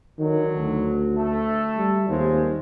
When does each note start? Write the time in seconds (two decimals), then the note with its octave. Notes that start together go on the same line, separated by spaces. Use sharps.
0.19 D3 D#3 F#3
0.56 D2
1.16 A3 A4
1.77 G3
2.09 D#2 G#3 C4 F4